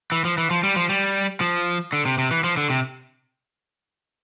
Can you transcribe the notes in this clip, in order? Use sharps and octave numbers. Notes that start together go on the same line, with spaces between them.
E3
F3
E3
F3
G3
F3
G3
F3
D3
C3
C3
E3
F3
D3
C3